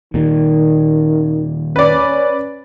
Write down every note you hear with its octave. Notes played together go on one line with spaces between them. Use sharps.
D#2 A#2 D#3
C#4 B4 D5